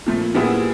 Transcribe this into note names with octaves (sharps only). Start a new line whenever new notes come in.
A#2 F3 A3
A#2 G3 B3 E4 G#4